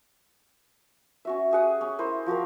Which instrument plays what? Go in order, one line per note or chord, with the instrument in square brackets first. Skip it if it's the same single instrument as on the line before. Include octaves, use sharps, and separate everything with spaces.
[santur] C#4 F#4 E5
G4 G#4 F#5 D#6
C#4
E4 A#4 C5
F3 F#4 G4 A#4